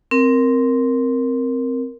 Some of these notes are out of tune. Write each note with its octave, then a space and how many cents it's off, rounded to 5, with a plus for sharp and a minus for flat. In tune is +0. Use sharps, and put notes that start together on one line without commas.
C4 +0 A#4 +0